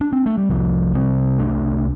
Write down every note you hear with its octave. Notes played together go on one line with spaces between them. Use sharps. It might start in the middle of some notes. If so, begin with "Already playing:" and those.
D4
C4
A3
G3
C2 F3
C3 G3 C4
C2 A3 D4